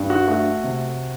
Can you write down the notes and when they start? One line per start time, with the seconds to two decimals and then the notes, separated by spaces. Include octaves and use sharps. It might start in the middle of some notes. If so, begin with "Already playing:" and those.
Already playing: G2
0.10 F#4
0.27 A3 F#4
0.64 C3